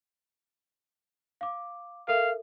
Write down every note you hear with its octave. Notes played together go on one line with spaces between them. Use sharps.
F5 D6
A4 A#4 E5 F5